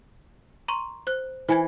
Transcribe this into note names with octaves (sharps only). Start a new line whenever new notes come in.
A#5 C6 C#6
C5 F#6
E3 C5 G#5 G#6